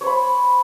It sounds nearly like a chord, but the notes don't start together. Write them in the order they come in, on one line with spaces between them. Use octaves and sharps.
C#5 C5 B5